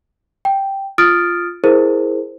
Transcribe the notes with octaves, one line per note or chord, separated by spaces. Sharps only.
G5
F4 D#6 F6 A6 D7
E4 G#4 A#4 C5